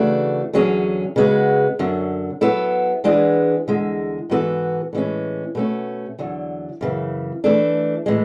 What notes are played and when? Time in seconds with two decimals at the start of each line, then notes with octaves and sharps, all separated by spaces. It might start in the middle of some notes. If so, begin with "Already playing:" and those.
Already playing: C#3 E3 A3 D4 F#4
0.53 E2 D3 F#3 C#4 G#4
1.16 C#3 G#3 B3 F#4
1.79 F#2 D3 F#3
2.41 F#3 B3 E4 A4
3.04 E3 G#3 B3 D4 G#4
3.68 E2 D3 G#3
4.30 G#2 E3 B3 F#4 A4
4.93 A2 E3 G#3 C#4
5.55 B2 A3 C#4
6.19 E2 D3 F#3
6.81 F#2 C#3 E3
7.44 E3 A3 D4 A4
8.06 A2 E3 G#3